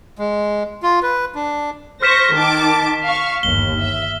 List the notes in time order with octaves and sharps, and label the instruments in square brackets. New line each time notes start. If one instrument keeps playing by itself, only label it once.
[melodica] G#3
F4
B4
D4
[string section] C5 C#6 A#6 [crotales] F6 B6 E7
[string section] D#3 A5 D6
F5 C#6
[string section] G1 D#2 [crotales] G7
[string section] E5